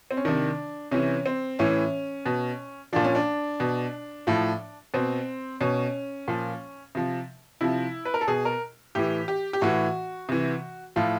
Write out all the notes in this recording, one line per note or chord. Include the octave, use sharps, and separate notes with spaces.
C4
C#4
C3 D#3 D4
C3 E3 C#4
C4
A2 E3 C#4
B2
A#2 F3 D4
C#4
D4
B2
A2 F3
B2 C4
B2 C#4
A#2 F3
C3 F3
C3 F3 E4
B4
A#4
A4
B2 G#4
A#4
A2 E3 G4
G4
G4
A2 E3 F#4
C3 E3
A2 F3 F4